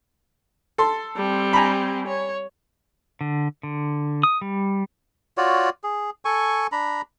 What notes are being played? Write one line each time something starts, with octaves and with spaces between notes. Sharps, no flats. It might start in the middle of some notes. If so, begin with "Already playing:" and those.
A4 C6
G3 C4
G#5 A#5 B5
C#5
D3
D3
D#6
G3
F4 F#4 C#5 D5
G#4
A4 G#5 C#6
D4 A#5 B5